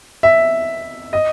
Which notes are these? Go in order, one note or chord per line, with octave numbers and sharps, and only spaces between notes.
E5
D#5